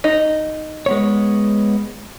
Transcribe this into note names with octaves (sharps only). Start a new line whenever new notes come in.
D#4
G#3 B3 C#5